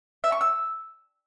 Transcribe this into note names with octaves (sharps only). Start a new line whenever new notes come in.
E5
C#6
E6